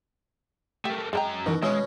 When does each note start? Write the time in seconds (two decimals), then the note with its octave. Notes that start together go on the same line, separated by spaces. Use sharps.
0.85 A3 A#3 G4
1.13 F#2 G#3 B4 G5 A#5
1.46 B2 D#3 E3
1.63 B2 G#3 C#4 E5